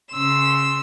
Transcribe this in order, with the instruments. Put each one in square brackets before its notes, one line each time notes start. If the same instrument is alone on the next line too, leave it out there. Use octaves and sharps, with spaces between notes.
[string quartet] C#3 C6 E6